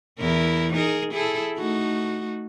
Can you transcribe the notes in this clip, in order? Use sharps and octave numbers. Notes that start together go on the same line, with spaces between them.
E2 E4 A#4
D#4 G#4 A#4
E4 G#4 A4
A3 D#4 F#4